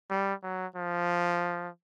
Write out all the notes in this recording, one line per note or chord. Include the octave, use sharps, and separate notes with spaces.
G3
F#3
F3